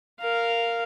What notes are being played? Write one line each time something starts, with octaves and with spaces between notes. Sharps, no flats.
A#4 F5